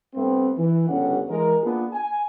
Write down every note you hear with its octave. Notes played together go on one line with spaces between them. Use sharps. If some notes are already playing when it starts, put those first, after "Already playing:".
G2 A3 B3 C4
E3
G1 D2 G2 C#3 C#4 F#5
E3 G#3 A#4
A#3 B3 D4 F4 G#4
G#5